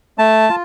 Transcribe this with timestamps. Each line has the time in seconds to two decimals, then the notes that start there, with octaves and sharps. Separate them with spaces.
0.18 A3 A5
0.49 F4